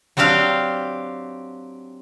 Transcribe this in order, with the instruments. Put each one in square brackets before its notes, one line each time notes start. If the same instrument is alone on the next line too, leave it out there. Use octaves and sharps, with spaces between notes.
[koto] F#3 C4 D4 G4 F5